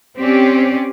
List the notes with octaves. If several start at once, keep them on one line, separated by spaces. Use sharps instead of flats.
C4 C#4 G4 D5